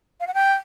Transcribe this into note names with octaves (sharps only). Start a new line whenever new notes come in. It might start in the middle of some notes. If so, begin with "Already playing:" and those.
F5
F#5
G5